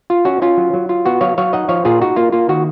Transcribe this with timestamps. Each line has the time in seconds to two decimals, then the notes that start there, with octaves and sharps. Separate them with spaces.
0.10 F4
0.25 C#4 F#4
0.42 C#4 F4
0.57 F#3
0.73 F#3
0.89 F4
1.06 B3 F#4
1.21 F#3 C#5 F5
1.38 F#3 C#5 F5
1.53 D#4 D#5 F#5
1.69 F3 C#5 F5
1.85 A#2 F4 G#4
2.01 D#4 F#4
2.16 A#3 F4
2.32 A#3 F4
2.49 D#3 F#4